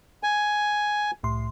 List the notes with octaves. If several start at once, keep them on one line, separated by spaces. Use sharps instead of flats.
G#5
C2 A2 C6